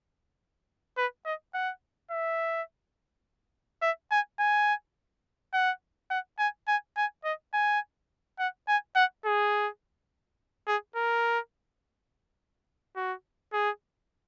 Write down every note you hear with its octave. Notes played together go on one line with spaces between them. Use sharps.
B4
D#5
F#5
E5
E5
G#5
G#5
F#5
F#5
G#5
G#5
G#5
D#5
G#5
F#5
G#5
F#5
G#4
G#4
A#4
F#4
G#4